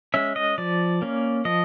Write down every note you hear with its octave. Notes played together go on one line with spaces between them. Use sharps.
G#3 C#4 E5
D#5
F3 D5
A#3 C#4
F3 D#5